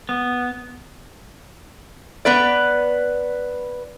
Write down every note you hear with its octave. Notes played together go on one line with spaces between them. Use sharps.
B3
B3 B4 D5